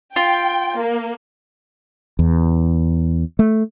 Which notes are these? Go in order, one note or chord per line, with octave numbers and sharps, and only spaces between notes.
F4 G5
A#3
E2
A3